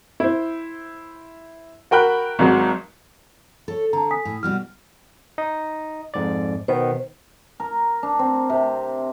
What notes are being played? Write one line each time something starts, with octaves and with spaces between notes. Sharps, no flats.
E4 C5
F#4 A#4 G5 B5 F#6
G#1 G#2 F#3
A4 C#5
D3 A5 A#5
G#5 D#6 B6
A2
B2 G3 F#4 F6
D#4 D#5
F2 G#2 D5
B2 D#3 B3 C5
A#4
D4
C4
C3